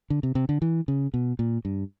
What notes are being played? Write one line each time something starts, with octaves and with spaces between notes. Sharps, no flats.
D3
C3
C3
D3
E3
C#3
B2
A#2
G2